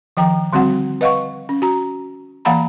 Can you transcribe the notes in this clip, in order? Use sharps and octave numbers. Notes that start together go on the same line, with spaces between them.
D#3 F3 G5 A#5
D3 G3 C4 F#4 F#5
B4 D#5 F5 F#5 C#6
C#4
F#4 A#5
E3 A#3 F5 F#5 A#5 B5